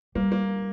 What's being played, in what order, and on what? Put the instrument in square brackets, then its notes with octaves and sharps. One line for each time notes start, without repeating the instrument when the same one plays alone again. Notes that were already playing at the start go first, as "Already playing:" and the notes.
[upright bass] G3 [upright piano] A#3
[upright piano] A#3